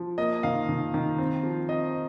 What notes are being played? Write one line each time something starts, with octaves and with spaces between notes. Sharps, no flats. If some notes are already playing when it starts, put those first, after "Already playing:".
Already playing: F3
A#3 D#5
D#3 F5
D#3
D#3
C4
F3
C4 D#5